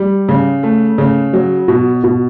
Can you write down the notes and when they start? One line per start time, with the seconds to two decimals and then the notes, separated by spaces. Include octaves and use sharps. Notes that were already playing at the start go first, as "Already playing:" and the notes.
Already playing: G3
0.29 C#3
0.63 A3
0.98 C#3
1.33 F#3
1.68 B2
2.04 B2